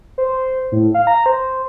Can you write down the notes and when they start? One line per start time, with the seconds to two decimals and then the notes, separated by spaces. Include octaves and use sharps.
0.18 C5
0.72 A2
0.94 F5
1.07 A#5
1.26 C5